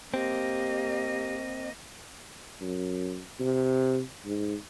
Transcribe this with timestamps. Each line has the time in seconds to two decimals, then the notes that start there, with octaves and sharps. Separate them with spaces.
0.14 A#3 C4 G4 D#5
2.61 F#2
3.40 C3
4.25 G#2